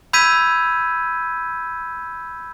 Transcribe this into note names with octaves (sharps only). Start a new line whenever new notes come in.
B5 E6 G6 G#6 B6 D#7